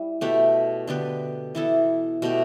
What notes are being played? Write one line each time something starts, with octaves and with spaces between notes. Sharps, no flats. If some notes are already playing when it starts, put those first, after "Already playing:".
Already playing: G3 E4
B2 A3 G4 B4
D3 B3 G4 B4
E3 B3 E4 A4
B2 A3 G4